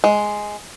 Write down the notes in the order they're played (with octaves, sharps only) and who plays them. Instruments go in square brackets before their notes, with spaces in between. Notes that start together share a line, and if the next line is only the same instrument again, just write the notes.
[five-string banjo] G#3